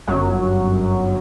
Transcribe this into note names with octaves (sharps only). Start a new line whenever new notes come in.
G1 F#2 F#3